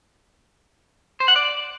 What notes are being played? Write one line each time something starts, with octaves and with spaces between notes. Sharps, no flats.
C5
F#5
D5